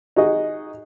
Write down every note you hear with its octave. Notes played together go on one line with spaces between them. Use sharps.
D#4 F#4 G#4 D#5